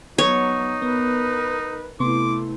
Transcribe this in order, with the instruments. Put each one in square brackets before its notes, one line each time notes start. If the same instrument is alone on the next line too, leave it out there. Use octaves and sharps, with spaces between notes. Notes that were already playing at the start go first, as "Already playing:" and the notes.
[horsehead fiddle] F#3 B3 [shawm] D#4 [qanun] C#5
[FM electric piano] B3 [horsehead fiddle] A#4 B4
[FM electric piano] C3 B3 C6 [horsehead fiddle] A3 E4 [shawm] D6